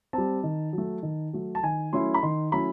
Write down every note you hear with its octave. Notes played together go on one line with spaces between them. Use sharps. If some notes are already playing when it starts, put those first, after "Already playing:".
G3 C4 A5
D#3
F#3 A3
D#3
F#3 A3
A5
D#3 G#5
F#3 A3 C#4 E4 C6
B5
D#3 C6
F#3 A3 C#4 E4 B5